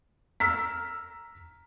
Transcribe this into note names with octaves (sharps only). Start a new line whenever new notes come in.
A#5 E6 F6 B6